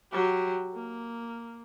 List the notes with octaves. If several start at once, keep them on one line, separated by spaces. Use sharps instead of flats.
F#3 G4
A#3